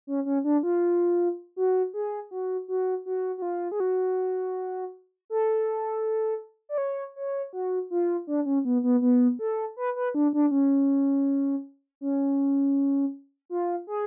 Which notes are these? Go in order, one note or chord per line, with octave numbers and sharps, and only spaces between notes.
C#4
C#4
D4
F4
F#4
G#4
F#4
F#4
F#4
F#4
F4
G#4
F#4
A4
D5
C#5
C#5
F#4
F4
D4
C#4
B3
B3
B3
A4
B4
B4
D4
D4
C#4
C#4
F4
G#4